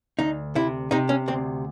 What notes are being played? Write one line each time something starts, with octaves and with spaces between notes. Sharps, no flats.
D2 D#4
C3 E4
C3 D#4
C#4
D2 C4